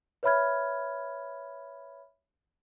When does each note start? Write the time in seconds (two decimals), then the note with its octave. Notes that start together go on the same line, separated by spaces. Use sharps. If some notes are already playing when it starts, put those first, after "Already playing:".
0.23 B4 C#5 E5 B5 F6 G#6